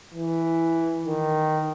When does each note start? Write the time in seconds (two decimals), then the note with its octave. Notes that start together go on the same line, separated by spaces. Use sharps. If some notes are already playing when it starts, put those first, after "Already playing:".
0.14 E3
1.06 D#3